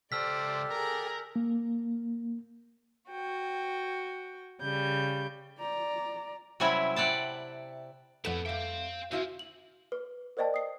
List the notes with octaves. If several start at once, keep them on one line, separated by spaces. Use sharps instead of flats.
C#2 G4 A4 C5 D5 E6 F6 B6
G#4 A#4 A#5
A#3
F#4 G5
C#3 G3 G6
D5 A#5
C3 F#3 G3 C#4 E4 E5
D5 F#5 G5 A5
F2 A2 B3 A4 B4 F#5 E7
G3 A3 C5 F5 G5
D3 C4 C#4 E4 F#4 F5
F#7
B4
A#4 C5 D5 D#5 G5 A5
D#6 C7